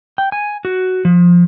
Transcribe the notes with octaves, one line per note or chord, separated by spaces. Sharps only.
G5
G#5
F#4
F3